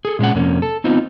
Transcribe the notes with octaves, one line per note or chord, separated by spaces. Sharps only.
G#4 A4
A#2 G#3 C#4 F#5
F2 C3 A#3 C#4
A4
B3 C4 D#4 F4